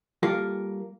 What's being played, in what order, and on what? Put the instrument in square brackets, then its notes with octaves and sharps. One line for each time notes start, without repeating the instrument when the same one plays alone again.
[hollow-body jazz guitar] G3 A#3 F4 A4 A#4 F5